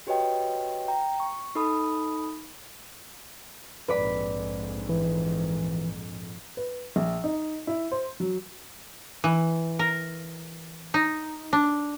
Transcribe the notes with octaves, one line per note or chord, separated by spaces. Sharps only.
F#4 G4 B4 C#5 D#5 G5
G5 A#5
C#6
D#4 A4 B5 D#6
A#1 F2 G#2 B4 D5 B5
E3
B4
A#1
D#4
E4
C5
F#3
E3
A#4
D#4
D4